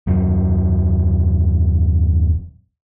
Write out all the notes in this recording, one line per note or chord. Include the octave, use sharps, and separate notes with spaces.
D#1 F#2 F#3